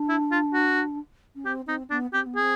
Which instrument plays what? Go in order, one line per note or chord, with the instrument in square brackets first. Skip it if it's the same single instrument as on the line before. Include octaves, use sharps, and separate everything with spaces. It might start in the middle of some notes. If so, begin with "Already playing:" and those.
Already playing: [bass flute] D4
[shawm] E4
F4
F#4
[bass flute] C#4
[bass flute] C4 [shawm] G4
[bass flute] C4 [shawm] D#4
[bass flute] B3 [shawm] D4
[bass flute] C4 [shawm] G4
[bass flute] B3
[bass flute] C4 [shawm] G#4